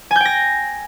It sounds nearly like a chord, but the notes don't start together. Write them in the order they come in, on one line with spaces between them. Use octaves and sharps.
G#5 G6 G5 A#6